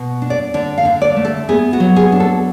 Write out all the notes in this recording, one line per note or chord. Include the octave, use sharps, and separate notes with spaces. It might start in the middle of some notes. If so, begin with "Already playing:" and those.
Already playing: B2
D4
D5
D3 D5
F5
D3
D5
A3
A4
B3 G#4
F#4
F#3
G#4
D4
A4